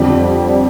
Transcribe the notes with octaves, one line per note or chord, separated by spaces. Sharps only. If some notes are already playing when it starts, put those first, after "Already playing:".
Already playing: F2 D3 G3 C4 G4